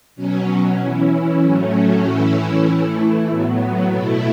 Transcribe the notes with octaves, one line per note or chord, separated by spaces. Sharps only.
B2 F#3 C#4
E3 C#4 E4
A2 F#3 A3 C#4
A2 E3 C#4 E4
E3 A3 E4
A2 F#3 B3
B2 A3 E4